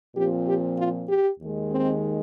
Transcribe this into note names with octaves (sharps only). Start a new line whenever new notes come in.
A#2 F3 C4 G4
G4
F4
G4
D#2 D#3 G#3
C4